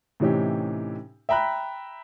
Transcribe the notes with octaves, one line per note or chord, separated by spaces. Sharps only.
A2 C3 E3 C#4 D#4 G4
E5 G5 A#5 B5 F#6